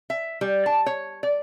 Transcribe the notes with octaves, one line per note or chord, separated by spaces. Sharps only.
E5
G3
A5
C#5
D5